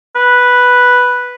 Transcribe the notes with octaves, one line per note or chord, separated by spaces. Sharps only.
B4